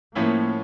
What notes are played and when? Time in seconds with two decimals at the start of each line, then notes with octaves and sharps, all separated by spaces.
0.15 A2 F3 A#3 C#4 E4